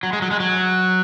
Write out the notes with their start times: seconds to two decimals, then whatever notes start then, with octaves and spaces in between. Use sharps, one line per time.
0.03 F#3
0.13 G#3
0.22 F#3
0.31 G#3
0.40 F#3